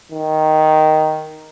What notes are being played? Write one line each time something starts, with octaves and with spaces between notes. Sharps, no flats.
D#3